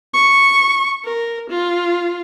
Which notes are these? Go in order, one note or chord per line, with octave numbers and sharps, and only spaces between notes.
C#6
A#4
F4